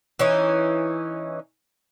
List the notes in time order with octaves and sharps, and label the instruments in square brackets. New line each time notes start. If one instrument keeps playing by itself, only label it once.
[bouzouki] E3 C#4 D#4